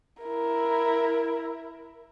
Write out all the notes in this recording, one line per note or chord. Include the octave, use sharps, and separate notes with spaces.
E4 A#4